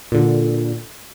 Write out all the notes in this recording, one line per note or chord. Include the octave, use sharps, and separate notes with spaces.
A#2 D3